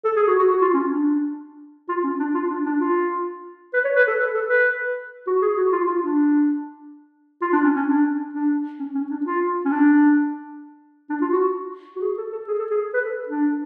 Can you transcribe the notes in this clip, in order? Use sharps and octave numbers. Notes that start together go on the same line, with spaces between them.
A4
G#4
F#4
F#4
F#4
F4
C#4
D4
F4
C#4
D4
F4
D4
D4
F4
B4
C#5
B4
A4
B4
A4
B4
F#4
G#4
F#4
F4
F4
D4
F4
D4
C#4
C#4
D4
D4
C#4
C#4
D4
F4
C#4
D4
D4
F4
F#4
F#4
G#4
A4
A4
G#4
A4
G#4
B4
A4
D4